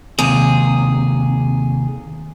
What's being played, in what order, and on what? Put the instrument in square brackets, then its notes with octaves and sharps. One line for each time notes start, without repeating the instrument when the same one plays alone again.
[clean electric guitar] D#2 C3 [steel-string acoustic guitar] G#4